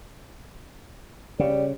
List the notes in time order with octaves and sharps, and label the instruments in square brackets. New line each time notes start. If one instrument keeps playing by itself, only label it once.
[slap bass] C#3 [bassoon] G3